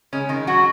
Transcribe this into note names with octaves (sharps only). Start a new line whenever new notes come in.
C#3 G#3 C#4
D#3 D#4
F#3 F#4